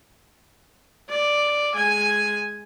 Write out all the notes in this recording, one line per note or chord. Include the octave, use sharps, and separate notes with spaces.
D5
G#3 G#5